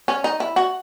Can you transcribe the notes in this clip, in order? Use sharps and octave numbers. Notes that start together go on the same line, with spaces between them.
C#4
D#4
E4
F#4